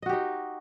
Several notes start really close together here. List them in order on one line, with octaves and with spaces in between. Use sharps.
D#5 F#4 G4 D#4